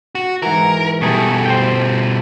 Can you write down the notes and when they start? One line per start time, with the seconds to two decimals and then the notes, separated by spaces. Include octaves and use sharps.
0.15 F#4
0.42 G#2 E3 A#4
1.01 B2 G3 A3 G#4
1.46 C5 G5